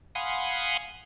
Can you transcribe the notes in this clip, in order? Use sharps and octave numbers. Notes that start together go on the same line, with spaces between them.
F5 F#5 G#5 B5 C6 D#6